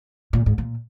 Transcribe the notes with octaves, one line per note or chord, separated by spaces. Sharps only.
A#2
G#2
A#2